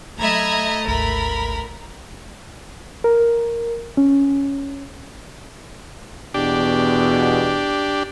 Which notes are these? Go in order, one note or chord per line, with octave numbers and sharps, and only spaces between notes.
F#3 A3 D#5 E5 A#5 B5 G#6
G#1 D2 A#4 B5
A#4
C#4
E2 B2 D4 G4